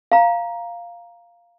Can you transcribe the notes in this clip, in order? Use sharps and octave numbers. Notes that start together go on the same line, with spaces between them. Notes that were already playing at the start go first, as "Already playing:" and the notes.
F5 A#5